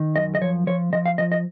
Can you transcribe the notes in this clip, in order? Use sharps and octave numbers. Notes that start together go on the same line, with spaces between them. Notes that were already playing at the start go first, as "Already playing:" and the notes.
Already playing: D#3
F#2 D#5
D#5
F3 C#5
F3 C#5
F3 D#5
F5
F3 D#5
D#5